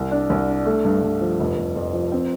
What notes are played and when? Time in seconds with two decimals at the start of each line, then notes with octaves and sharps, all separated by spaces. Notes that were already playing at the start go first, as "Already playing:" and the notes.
Already playing: C2
0.11 D4
0.30 C2
0.48 D4
0.66 A3
0.85 G2
1.02 G2
1.21 F3
1.40 F1
1.57 F1
1.76 F2
1.93 F3
2.12 C4